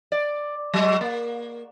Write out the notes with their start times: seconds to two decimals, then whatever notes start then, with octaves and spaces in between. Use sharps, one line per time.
0.12 D5
0.74 F#3 G#3
1.01 A#3